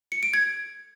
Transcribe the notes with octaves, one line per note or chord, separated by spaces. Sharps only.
C#7
D7
G#6